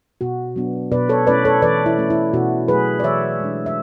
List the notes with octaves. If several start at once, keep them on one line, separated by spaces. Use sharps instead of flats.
B2 F#4
F#3 B3 D4
B2 B4 D5
A4 C#5
A3 C#4 E4 B4 D5
A4 C#5
E3 B4 D5
E4
A3 C#4 E4
E4
B2 F#4
F#3 A3 G#4 B4
D5
E3 C#5 E5
G#3 D4
E5